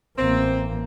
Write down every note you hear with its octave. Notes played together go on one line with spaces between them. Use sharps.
A1 A#3 C4